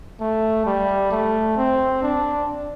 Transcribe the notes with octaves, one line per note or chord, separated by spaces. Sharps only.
A3
G3
A3
C4
D4